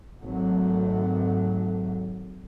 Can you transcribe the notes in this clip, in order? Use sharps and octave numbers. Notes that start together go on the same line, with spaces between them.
G#1 F#3 A3